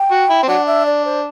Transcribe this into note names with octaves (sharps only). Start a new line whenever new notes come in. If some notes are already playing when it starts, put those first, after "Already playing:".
Already playing: G5
F#4
E4
C4
F#3 D4 F#5
E5
D5
C5